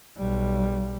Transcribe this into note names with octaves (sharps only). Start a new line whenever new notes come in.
B1 G3